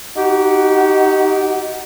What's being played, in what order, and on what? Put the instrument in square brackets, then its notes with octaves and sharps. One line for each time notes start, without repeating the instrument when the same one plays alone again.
[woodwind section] D#4 F#4 G4 F#5